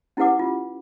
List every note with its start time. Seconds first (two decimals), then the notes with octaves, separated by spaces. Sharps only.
0.17 C#4 E4 G4 B4 F#5 D6
0.39 F4